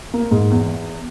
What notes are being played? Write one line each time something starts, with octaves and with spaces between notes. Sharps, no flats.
A#3
G#2
E2